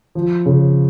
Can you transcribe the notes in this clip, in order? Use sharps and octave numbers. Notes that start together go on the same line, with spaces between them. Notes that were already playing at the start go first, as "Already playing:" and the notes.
F3
C#3